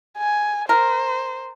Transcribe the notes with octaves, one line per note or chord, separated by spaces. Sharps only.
G#5
A#4 C5